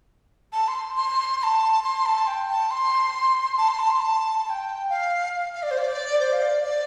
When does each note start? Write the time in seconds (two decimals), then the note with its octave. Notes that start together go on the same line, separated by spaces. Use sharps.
0.53 A5
0.68 C6
0.97 C6
1.40 C6
1.44 A5
1.84 C6
2.06 A5
2.27 G5
2.49 A5
2.71 C6
3.58 A5
3.69 C6
3.79 A5
3.90 C6
4.02 A5
4.45 A5
4.50 G5
4.90 F5
5.55 F5
5.63 D5
5.71 C5
5.79 D5
6.20 C5
6.32 F5
6.42 D5
6.63 D5